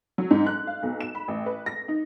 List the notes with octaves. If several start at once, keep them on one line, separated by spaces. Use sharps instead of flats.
F#3
G#2
F#6
F5
B1
E7
B5
A1
B4
A#6
D#4